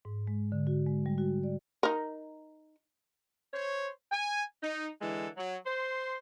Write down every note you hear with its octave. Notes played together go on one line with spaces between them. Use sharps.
G#2
G#3
D3
F#4
G#3
G3
F#4
D5
D#4 A#4
C5 C#5
G#5
D#4
D3 E3 G#3 A4
F#3
C5 C6